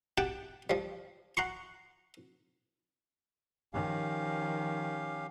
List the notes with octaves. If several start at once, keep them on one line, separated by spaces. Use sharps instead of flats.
G4 F#5 G5 A5
F3 G3
F#5 A#5 C6 C#6
D#3 F3 C#4 G4 F5